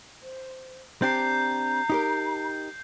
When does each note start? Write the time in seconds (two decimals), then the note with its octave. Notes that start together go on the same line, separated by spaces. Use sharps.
0.22 C5
1.02 C4 D4 G4 A#5 G6 C7
1.90 D#4 G4 A#4